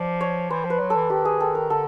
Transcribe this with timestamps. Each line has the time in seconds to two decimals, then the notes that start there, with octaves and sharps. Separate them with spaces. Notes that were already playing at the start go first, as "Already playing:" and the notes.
Already playing: F3 D5
0.21 C#5
0.50 E3 C5
0.65 F3
0.70 B4
0.80 F#3
0.90 A4
0.95 E3
1.10 D#3 G4
1.25 G#4
1.40 A4
1.55 A#4
1.70 D3 A4